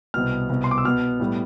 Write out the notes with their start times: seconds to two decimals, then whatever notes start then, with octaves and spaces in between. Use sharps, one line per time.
0.14 C2 B2 B3 F6
0.49 C2 B2 B3
0.64 C6
0.71 D6
0.78 E6
0.85 B2 B3 F6
1.20 A2 G3 B3